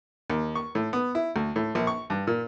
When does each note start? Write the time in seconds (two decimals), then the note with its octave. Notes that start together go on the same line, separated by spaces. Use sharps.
0.30 D#2
0.55 C#6
0.75 A2
0.93 B3
1.15 E4
1.36 D2
1.56 A2
1.75 A#1
1.87 C#6
2.10 G2
2.27 A#2